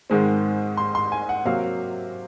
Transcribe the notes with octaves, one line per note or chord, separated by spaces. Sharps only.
G#2 D#3 G#3 C4
C6
C6
G#5
F#5
C3 F#3 A#3 F5